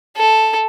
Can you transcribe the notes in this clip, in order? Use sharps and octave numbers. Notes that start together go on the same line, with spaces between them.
A4